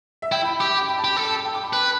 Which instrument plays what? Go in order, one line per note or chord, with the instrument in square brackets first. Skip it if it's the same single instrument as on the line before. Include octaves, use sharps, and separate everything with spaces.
[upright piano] E5
[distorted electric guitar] E4 [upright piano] G5
[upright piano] B5
[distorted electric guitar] G4 [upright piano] D6
[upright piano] G5
B5
A5
[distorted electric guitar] G4
A4
[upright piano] A5
G5
D6
B5
[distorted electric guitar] B4